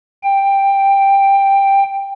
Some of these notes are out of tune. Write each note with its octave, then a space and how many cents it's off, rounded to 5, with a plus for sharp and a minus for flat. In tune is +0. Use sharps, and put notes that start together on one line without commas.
G5 +10